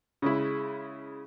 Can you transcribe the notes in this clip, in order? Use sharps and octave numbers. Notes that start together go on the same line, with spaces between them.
C#3 G#3 E4